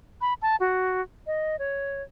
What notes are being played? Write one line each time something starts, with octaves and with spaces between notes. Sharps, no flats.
B5
A5
F#4
D#5
C#5